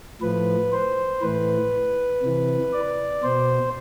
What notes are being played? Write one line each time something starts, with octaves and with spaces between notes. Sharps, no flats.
A2 F3 B4
C5
A2 E3 B4
C3 E3
D5
B2 C5